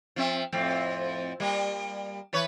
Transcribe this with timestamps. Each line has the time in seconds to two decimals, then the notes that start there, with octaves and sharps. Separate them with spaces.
0.16 F3 C4 E5
0.52 F2 A2 C4
1.40 G3 A#3
2.33 E3 B4 C#5